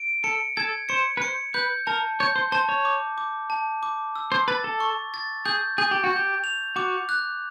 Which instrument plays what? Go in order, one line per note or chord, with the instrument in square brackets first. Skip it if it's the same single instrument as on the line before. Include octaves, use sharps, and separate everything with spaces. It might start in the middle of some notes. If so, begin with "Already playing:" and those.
Already playing: [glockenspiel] D7
[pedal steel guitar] A4 [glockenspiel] C#7
[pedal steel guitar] A4 [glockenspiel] G#6
[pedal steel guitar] C5 [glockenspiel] C#7
[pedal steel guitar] B4
[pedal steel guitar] C5 [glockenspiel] C#7
[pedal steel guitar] B4 [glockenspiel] G6
[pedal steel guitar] A#4 [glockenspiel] A5
[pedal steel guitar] C#5 [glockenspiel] G6
[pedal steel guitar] C5
[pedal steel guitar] C5 [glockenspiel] A5
[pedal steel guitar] C#5
[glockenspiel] D6
D6
A5
D6
E6
[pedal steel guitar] C5
[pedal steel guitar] B4 [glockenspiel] A6
[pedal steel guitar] A4
[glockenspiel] C#6
A6
[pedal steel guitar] G#4 [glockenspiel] G6
[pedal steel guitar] G#4 [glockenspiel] G6
[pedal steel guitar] G4
F#4
[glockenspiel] G6
[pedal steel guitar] G4
[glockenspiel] F7
[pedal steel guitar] F#4 [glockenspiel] D6
[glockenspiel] F#6